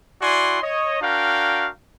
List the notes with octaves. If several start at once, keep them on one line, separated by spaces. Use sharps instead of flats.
E4 F#4 D5 G#5 C6
C#5 D#5
D4 F#4 A#4 F5 G5